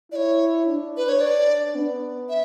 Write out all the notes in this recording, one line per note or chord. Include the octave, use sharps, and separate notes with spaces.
E4 C#5 D5
D4
B4
C#5
D5
B3
E5